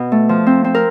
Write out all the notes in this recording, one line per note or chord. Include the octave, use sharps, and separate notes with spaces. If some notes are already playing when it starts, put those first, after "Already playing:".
Already playing: B2
A3
F3
C4
C4
A#4